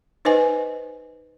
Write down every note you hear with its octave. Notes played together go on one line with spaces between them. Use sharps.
D#4 B4 C5 D#5 G#5